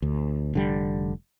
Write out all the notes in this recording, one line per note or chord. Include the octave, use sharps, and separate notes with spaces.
D2
F1 D3 G3